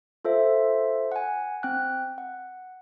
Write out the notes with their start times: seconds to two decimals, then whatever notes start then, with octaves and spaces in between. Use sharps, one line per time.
0.25 F4 A4 C5 E5
1.12 F#5 G#5
1.63 C4 G5 F#6
2.18 F#5